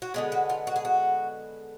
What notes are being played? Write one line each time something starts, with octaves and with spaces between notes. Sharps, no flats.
F#4
D3 G#3 B3 G#4
F#4
F4
F#4
G#4
F#4